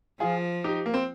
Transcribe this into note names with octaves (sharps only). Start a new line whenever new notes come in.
F3 F4 G#4
D#4 G4
A#3
C4